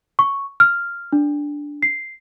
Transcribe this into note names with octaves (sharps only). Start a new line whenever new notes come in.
C#6
F6
D4
C7